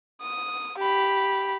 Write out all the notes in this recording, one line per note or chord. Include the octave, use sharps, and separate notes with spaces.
D#6
G4 B5